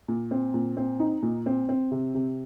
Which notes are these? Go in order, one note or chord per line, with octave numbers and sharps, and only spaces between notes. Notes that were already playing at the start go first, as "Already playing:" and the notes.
A#2
C4
A#2
C4
D#4
A#2
C4
C4
C3
C3